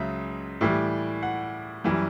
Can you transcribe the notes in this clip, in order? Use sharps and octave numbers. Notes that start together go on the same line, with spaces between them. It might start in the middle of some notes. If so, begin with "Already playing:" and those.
Already playing: C#2 C#3 F#3 E5
A2 E3 G3
F#5
F#2 E3 G3